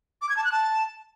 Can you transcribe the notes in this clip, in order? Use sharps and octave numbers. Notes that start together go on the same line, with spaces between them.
D6
G#6
A5
F#6
A5